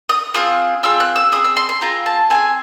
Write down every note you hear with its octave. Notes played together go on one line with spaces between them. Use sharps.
D#6
C4 F4 G#4 D#6
C4 F4 G#4 E6
F#6
E6
C4 F4 G#4 D#6
E6
C6
C6
C4 F4 G#4 A#5
A5
C4 F4 G#4 G#5